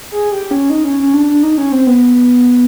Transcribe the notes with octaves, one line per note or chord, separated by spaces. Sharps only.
G#4
G4
C#4
D#4
C#4
C#4
D4
D4
D#4
C#4
C4
B3